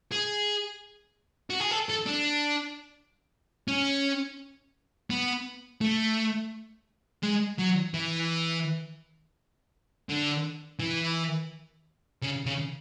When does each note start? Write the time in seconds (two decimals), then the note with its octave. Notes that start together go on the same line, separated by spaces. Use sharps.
0.12 G#4
1.50 F#4
1.60 G#4
1.71 A4
1.89 A4
2.06 D4
3.68 C#4
5.10 B3
5.81 A3
7.23 G#3
7.59 F#3
7.94 E3
10.09 D3
10.79 E3
12.22 C#3
12.46 C#3